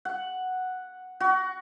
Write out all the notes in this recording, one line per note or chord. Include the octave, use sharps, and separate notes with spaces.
F#5
F#4